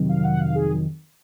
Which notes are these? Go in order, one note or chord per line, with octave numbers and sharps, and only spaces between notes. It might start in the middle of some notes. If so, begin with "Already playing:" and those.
Already playing: F2 C3 D#3 F#3
F5
F#5
F5
G#4